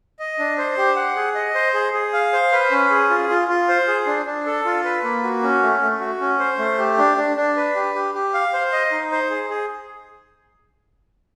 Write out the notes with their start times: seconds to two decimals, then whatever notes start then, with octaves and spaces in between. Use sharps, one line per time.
0.19 D#5
0.39 D4
0.58 C5
0.78 G4
0.96 F#5
1.16 G#4
1.35 D#5
1.55 C5
1.74 G#4
1.94 G#4
2.13 F5
2.33 C5
2.52 B4
2.71 C#4
2.90 G#4
3.10 F4
3.29 F4
3.48 F4
3.69 C5
3.88 G#4
4.07 D4
4.26 D4
4.46 A4
4.65 F4
4.84 B4
5.04 A#3
5.23 F#4
5.43 C#4
5.63 A3
5.82 A3
6.01 F#4
6.21 C#4
6.39 C5
6.59 A3
6.78 G4
6.98 D4
7.17 D4
7.37 D4
7.57 B4
7.75 G4
7.94 G4
8.14 G4
8.34 F5
8.53 C5
8.72 D#5
8.92 D#4
9.12 C5
9.30 G#4
9.50 G#4